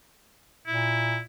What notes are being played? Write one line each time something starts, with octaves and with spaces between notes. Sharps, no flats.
A#2 E4